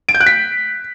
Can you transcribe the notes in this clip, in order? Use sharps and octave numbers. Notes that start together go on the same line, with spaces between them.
D7
G6
F#6
B6